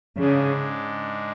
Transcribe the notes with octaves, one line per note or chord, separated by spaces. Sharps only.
G#2 C#3 G#3 D4